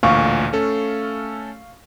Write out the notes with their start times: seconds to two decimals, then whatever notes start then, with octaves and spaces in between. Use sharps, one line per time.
0.03 A1 D2 A#2 F5 C#6
0.53 A3 C#4 A4